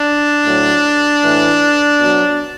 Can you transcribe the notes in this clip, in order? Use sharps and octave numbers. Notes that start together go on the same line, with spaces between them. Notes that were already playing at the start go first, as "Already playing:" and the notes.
Already playing: D4
A2 F#3
A2 E3
B2 F#3